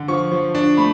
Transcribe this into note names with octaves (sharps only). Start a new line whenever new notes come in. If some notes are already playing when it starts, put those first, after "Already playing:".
Already playing: D3
F3 C#6
F3
D4
A3 B5